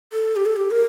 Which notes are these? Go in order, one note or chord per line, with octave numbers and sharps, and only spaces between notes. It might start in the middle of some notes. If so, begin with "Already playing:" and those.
A4
G4
A4
G4
A#4